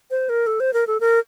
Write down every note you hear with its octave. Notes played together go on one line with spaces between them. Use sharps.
C5
A#4
A4
C5
A#4
A4
A#4